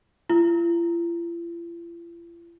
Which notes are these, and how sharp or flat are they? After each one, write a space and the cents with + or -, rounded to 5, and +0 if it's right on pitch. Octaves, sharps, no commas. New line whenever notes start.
F4 -45